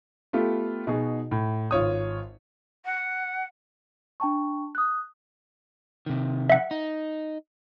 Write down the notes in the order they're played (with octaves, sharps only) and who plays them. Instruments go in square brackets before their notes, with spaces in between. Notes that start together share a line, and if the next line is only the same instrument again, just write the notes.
[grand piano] A3 B3 F4 G4 A4
B2 D#4 F#4 G#4
A2
G#1 F4 C#5 D#6
[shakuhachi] F#5
[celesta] D4 G5 A5 C#6
D#6 F#6
[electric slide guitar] C3 D#3
[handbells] E5 F#5
[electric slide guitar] D#4